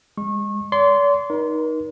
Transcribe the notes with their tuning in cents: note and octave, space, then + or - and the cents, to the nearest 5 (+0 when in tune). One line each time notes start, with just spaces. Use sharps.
G#3 -25 C#6 -30
D5 -45 C6 -15
D#4 +0 A#4 +40